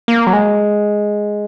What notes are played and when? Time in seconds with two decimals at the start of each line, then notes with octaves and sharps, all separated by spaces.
0.08 A#3
0.27 F#3
0.33 G#3